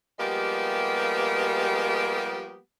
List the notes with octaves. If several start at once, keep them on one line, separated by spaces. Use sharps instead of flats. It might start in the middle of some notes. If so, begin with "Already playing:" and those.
F3 G3 G#3 A#3 B3 G4